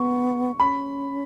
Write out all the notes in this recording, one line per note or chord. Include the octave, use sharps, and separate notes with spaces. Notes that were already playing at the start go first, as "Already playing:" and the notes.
Already playing: B3 C#6
C#4 B5